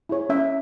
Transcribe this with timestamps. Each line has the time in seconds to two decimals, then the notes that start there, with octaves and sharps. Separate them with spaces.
0.09 E4 G#4 C#5
0.29 C#4 E5